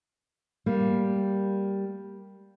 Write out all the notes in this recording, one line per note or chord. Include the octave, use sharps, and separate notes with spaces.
G3 A#3